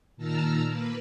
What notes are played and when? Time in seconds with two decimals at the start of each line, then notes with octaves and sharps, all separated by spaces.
0.17 A#2 D#3 A5 A#5 E6 F6
0.65 A#3 B4